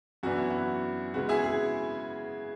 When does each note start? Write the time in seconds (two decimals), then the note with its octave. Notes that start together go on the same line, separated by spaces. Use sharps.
0.23 F#2 E3 B3 D4 F#4
0.37 E4
0.51 F#4
1.14 C#3 G#3 B3 F#4
1.29 E4 G#4
1.44 G#4